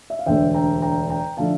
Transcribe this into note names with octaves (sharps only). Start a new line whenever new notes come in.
E5
F5
E1 D2 D3 A3 E5 G5
G5 A#5
G5 A#5
G5 A#5
D3 F3 A3 F5 A5